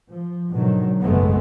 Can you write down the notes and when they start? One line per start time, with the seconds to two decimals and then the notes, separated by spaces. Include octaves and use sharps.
0.12 F3
0.50 G#2 B2 D3 D#3 F#3
1.02 F#1 B1 G#2 G#3 A3 B3